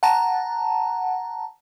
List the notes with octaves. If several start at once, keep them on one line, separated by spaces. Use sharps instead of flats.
F#5 A5 A#5